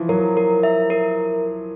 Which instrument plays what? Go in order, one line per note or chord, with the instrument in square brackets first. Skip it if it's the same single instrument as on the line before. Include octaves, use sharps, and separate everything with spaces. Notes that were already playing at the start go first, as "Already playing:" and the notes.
Already playing: [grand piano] E3 F3
[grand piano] F#3 [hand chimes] A#4
[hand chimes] A#4
E5
A#4